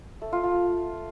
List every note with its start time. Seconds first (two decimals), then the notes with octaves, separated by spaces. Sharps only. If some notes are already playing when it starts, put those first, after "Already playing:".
0.22 A3
0.33 F4
0.43 F4